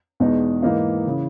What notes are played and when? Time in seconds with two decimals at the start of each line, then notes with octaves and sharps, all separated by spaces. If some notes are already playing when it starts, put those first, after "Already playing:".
0.20 E2 B2 G#3 D#4
0.63 G#2 E3 A#3 D#4
1.07 C#3 E3